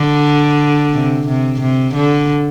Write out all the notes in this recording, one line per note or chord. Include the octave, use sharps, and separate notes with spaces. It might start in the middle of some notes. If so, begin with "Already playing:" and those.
Already playing: D3
C3
C3
C3
D3